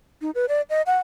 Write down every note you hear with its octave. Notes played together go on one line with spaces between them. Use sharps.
D#4
B4
D5
D#5
F#5